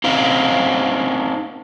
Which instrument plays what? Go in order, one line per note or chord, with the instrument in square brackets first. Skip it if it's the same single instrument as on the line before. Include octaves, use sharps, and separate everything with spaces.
[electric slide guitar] C4 C#4 D#4 C5 F5